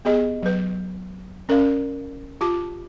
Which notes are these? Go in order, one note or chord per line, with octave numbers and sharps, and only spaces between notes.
B3 G4 G#4 D#5
F#3 B4
C#4 A#4 D5 F5
F4 G4 A5 D6